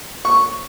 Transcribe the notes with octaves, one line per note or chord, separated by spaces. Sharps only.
C#6